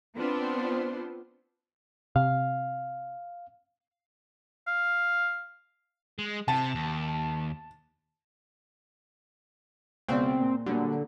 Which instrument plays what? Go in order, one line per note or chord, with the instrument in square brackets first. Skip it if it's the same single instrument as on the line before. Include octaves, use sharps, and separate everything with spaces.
[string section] B3 C4 D4 F4 B4 C5
[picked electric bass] C3 [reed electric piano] F5
[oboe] F5
[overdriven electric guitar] G#3
[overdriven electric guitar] C3 [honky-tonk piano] A5
[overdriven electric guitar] D#2
[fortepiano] C#2 B2 D5 [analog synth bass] C4
[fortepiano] A#2
[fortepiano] A#2 F#3 G3 [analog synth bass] D3